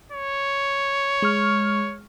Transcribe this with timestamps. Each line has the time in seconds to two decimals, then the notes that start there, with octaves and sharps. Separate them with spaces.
0.12 C#5
1.22 G#3 C#6 F6